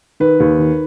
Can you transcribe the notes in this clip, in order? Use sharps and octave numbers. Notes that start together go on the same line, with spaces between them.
D#3 B4
D#2
D#3